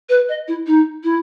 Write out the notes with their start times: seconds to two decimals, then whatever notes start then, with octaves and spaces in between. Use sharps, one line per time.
0.09 B4
0.29 D#5
0.48 E4
0.67 D#4
1.04 E4